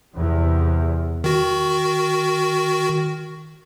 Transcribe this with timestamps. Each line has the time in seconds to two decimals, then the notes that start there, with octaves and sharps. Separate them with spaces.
0.14 E2 C3
1.24 D#3 F#4